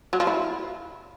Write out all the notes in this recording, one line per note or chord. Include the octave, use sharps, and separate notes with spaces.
F#3
F3
E4